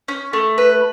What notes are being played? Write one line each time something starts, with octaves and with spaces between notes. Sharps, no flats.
C#4
A3
B4